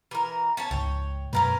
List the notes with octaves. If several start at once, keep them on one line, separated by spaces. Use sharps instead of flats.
E3 A#4
C#4 C#5 A5
C#2 G#2 C#5 G5
F#2 B2 G#3 C#4 A#4 B4